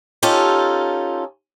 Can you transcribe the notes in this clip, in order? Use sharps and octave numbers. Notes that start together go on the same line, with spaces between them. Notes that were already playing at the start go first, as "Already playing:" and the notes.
C#4 D#4 F4 G4 A4